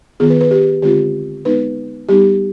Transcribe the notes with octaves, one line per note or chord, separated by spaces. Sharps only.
D#3 B3 F4 G#4
B4
B4
G4
D3 G#3 C4 F4 G4
G#3 B3 D#4 B4
G3 B3 D#4 G4